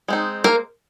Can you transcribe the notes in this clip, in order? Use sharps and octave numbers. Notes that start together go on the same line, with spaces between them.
G#3 C4 D#4
A#3 A#4